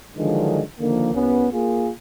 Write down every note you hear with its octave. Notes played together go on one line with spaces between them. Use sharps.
D3 D#3 F3 F#3 G#3 D4
D3 D#3 F3 A#3
C2 B3 C#4
A#3 F4 G#4